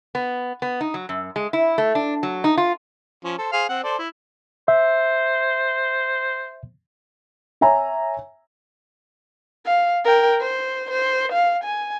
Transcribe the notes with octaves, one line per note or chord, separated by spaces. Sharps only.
B3
B3
D#4
F#3
F#2
G#3
E4
A3
D4
F#3
D#4
F4
F3 C#4
A4 C5
G#4 C5 F5
C4 F#5
A4 C5 D5
E4
C5 E5
C#5 E5 G#5 A#5
F5
A#4 G5
C5
C5
F5
G#5